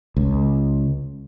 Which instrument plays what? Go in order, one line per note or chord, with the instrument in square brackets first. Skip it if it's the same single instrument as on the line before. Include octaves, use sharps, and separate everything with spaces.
[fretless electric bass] C#2